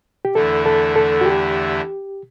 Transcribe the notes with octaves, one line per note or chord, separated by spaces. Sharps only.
G4
E2 D3 A3 E4 A4
A4
A4
F#4
G4